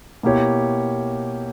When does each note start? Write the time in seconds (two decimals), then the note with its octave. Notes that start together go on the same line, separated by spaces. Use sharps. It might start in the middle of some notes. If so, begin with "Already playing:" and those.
0.23 B2 A#3 E4 G4 C#5